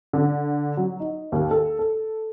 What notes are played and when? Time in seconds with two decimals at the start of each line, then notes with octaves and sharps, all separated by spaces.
0.13 D3
0.77 F#3
1.00 D#4
1.32 D#2
1.51 A4
1.79 A4